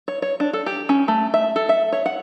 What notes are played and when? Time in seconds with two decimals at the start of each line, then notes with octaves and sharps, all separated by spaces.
0.08 C#5
0.22 C#5
0.40 D4
0.53 A4
0.66 G4
0.89 C#4
1.08 A3
1.34 E5
1.56 A4
1.69 E5
1.92 C#5
2.06 F#5